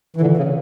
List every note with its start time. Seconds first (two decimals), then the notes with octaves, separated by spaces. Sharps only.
0.16 E3
0.21 A#2 D3
0.37 C#3